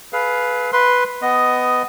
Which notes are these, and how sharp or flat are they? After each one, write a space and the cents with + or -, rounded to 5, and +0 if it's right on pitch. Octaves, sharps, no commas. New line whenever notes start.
G#4 +40 B4 +0 F5 +0
B4 +0 C6 +0
B3 +20 D#5 +0 D#6 +0